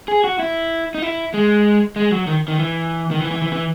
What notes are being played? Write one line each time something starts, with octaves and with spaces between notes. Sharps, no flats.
G#4
F#4
E4
D#4
E4
G#3
G#3
F#3
D#3
D#3
E3
D#3
E3
E3
E3
E3